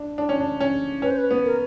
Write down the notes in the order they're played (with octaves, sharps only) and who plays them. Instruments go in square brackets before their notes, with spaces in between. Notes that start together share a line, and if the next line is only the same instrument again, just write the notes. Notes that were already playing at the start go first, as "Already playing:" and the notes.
Already playing: [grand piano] D4
D4
C#4
D4
C#4
[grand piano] C#4 [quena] B4
[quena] C5
B4
[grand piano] B3
[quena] A#4